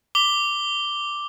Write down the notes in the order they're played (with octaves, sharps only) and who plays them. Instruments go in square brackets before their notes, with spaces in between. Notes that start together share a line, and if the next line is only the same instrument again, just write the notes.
[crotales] D6 G7